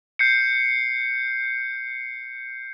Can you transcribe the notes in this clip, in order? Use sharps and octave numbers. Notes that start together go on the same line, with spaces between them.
G6 C7 C#7